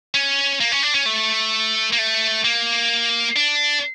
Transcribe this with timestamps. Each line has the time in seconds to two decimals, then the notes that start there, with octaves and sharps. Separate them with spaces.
0.14 C#4
0.61 A#3
0.72 C#4
0.83 D4
0.95 C#4
1.06 A3
1.93 A#3
1.98 A3
2.44 A#3
3.36 D4